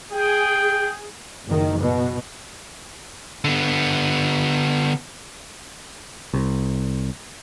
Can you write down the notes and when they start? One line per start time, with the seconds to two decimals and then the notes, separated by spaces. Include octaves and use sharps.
0.13 G#4 G5
1.46 F#1 D#3
1.80 B2
3.44 D3 B3
6.34 C2